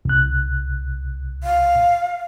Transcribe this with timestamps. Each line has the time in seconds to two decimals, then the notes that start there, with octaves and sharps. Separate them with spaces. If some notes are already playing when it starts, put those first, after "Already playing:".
0.05 C2 F#6
1.44 F5